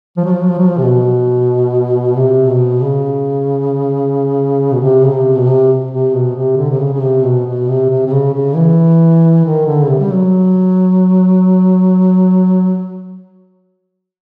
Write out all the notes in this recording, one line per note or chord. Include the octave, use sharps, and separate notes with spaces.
F3
F#3
F3
F#3
F3
F#3
F3
C3
B2
C3
B2
C#3
B2
C3
C#3
C3
B2
C3
C3
B2
C3
D3
C3
C#3
C#3
C3
B2
B2
C3
C3
C3
C#3
C#3
E3
D#3
D3
C#3
C3
G3
F#3